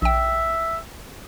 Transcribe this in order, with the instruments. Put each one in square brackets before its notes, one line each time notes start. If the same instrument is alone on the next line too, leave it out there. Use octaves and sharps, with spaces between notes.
[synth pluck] A#1 G5 [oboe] E5